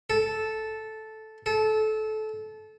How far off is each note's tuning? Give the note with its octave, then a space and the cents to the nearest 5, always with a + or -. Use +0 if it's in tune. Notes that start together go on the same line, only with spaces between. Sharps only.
A4 -10
A4 -25